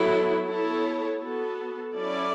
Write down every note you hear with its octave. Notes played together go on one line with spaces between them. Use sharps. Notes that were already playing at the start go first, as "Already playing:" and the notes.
Already playing: F#3 B3 E4 A4
B3 E4 A4 C#5
B3 F#4 A4
F#3 C#4 E4 A4 D5